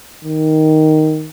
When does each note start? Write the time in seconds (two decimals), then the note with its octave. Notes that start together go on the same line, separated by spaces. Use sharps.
0.25 D#3